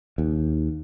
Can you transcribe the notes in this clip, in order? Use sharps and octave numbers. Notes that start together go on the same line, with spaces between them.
D#2